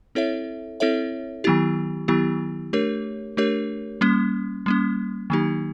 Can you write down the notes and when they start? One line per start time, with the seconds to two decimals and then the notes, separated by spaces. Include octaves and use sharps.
0.15 C4 E4 A4 C#5 E5
0.80 C4 E4 A4 C#5 E5
1.44 D#3 F#3 B3 E4 G4
2.08 D#3 F#3 B3 E4 G4
2.73 A3 D4 G4 A#4 C#5
3.37 A3 D4 G4 A#4 C#5
4.01 G3 A#3 C#4
4.66 G3 A#3 C#4
5.30 D#3 F#3 A#3 D#4 G4